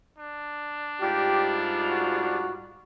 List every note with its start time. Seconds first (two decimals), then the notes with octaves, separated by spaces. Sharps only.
0.18 D4
1.01 G#2 G3 F4 G4
1.89 F#4